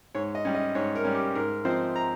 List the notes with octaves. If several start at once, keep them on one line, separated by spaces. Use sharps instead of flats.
G#2 C#5
D#5
G3 C#4
D#5
G#2 C#5
A#4
G3 C#4
G4
G#2 A#4
F3 C4 D#4 C5
A#5